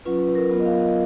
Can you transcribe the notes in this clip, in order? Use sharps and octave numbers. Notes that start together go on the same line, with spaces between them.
F#3 C#4 F4 B4
B4
A#4
F#3 B3 F4 A#4
D#5
F5
D#5